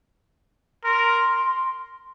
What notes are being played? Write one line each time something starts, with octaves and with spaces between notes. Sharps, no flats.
A#4 C6